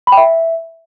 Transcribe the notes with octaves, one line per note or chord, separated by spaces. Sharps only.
B5
G5
E5